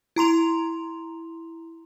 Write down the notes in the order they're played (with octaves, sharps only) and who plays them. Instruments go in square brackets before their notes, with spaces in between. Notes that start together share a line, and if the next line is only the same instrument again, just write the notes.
[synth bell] E4 A#5 C6 F7